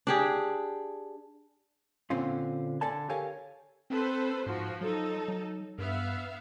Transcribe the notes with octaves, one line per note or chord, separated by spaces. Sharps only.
D4 G4 G#4
A#2 D3 C4 C#4 F4
D3 A4 D5 G#5 A5
G4 A4 A#4 C#5 F5 G#5
C4 A4 B4 C5
G#2 F3 F#4
F#3 D#4 A4
F#3
G2 B3 E5 F5